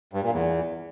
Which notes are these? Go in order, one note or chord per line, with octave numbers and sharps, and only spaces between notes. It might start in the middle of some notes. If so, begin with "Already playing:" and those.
G2
A#2
E2